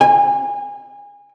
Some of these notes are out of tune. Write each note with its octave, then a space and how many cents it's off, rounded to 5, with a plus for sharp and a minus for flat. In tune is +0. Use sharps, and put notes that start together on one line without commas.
G#5 -30